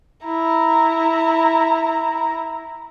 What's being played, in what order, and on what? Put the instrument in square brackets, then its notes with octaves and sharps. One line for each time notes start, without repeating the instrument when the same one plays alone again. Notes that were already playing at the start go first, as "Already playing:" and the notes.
[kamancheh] E4 A#5